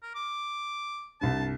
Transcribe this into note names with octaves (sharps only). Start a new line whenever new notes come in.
A#4
D6
C2 G2 A5